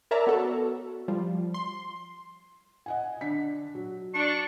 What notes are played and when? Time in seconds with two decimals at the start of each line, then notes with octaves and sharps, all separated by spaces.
0.11 A#4 C#5 D5 E5 A5 A#5
0.27 B3 F#4 A4
1.08 F3 G3
1.54 C6
2.86 D#5 F#5 G#5
3.21 D3 D4 B6
3.75 F#3
4.14 D4 C#6